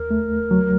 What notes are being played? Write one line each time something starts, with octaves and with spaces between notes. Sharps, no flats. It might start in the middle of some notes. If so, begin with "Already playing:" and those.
Already playing: D#2 A#4
A3
F#3